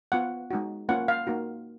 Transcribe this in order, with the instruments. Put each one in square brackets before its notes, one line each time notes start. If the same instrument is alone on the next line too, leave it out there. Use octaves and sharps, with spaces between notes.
[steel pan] B3 F4 F#5
G#3 D#4 F#4
A#3 C#4 F4 F#5
F5
A#3 D#4 F#4